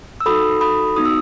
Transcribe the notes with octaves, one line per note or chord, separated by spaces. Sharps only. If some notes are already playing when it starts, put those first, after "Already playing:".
E6
D#4 F#4 A4 B5 D#6
B5 D#6
B3 D#4 F#4 D#6
E6